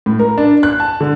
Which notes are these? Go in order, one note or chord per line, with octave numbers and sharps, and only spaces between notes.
A2
A#4
D4
F#6
A5
D3